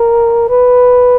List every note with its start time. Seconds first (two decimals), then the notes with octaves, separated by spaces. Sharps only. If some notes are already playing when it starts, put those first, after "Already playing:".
Already playing: A#4
0.49 B4